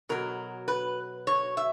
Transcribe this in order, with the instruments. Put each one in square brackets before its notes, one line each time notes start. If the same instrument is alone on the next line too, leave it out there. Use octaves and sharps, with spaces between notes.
[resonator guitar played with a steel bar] B2 F#3 A#4
B4
C#5
E5